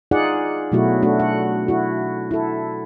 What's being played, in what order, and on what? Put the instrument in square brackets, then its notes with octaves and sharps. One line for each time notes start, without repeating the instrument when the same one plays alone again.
[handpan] D#4 F4 G#4 D5 F#5
B2 F#3 A3 E4 F#4
A3 D4 F#4
F#5
E4 F#4
E4 A4